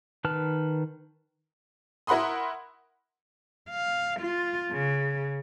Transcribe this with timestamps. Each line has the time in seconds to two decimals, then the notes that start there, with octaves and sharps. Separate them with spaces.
0.24 D#3 B4 A5 F6
2.07 E4 A#4 F#5 B5 C6 D#6
3.70 F5
4.20 F4
4.71 C#3